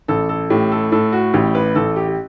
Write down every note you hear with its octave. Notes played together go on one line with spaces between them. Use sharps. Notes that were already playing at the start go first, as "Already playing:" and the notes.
A1 A4
A4
A2 G4
A4
A2 A4
F#4
A1 G4
B4
A1 A4
G4
G4